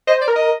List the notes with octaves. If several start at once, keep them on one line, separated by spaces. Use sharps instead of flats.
C5 D#5
D5
A#4
D#5